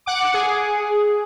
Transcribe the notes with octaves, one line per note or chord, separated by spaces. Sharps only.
F#5 D6
G#4